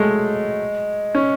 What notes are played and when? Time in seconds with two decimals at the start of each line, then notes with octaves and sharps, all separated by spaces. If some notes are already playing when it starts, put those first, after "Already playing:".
Already playing: F#3 G#3 A3
1.15 C#4